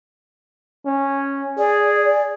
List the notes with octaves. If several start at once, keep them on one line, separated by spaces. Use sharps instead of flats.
C#4
G#4 D5